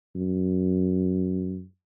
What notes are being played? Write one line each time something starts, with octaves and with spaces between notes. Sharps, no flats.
F#2